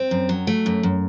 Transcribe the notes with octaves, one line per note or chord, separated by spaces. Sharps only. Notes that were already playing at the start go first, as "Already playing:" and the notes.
Already playing: C4
F#2
F#3
A3
F#2
F#2